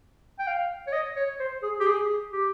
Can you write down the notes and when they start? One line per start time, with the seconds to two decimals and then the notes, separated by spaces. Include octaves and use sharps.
0.39 G5
0.47 F5
0.87 C#5
0.93 D#5
1.16 C#5
1.40 C5
1.62 G#4
1.80 G4
1.87 G#4
2.32 G4